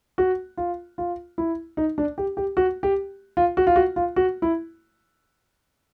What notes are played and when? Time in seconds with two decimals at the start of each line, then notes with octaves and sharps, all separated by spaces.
0.18 F#4
0.57 F4
0.98 F4
1.38 E4
1.77 D#4
1.98 D4
2.18 G4
2.37 G4
2.57 F#4
2.83 G4
3.37 F4
3.57 F#4
3.67 F4
3.76 F#4
3.96 F4
4.16 F#4
4.42 E4